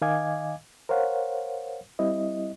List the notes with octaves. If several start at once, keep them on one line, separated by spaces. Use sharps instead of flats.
D#3 D#5 F5 G#5 D6 G#6
A#4 C5 C#5 F5 F#5
G3 C4 E4 D#5